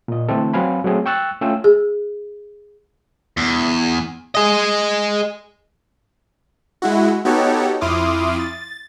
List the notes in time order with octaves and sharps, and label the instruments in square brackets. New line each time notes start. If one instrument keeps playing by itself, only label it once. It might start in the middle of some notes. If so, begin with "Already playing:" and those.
[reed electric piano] A#2 D#5
D3 E3 A3 C4 A4
F#3 C4 B4 F5 G#5 B5
F#3 A3 C4 G#4
G5 C#6 E6 F#6 A6
A3 C#4 F4 G5 E6
[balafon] G#4
[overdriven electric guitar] E2
G#4 D#5
[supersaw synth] G#3 E4 F#4
B3 D#4 F#4 G4 A4 C#5
F2 E4 C6 D6 D#6 F6
A6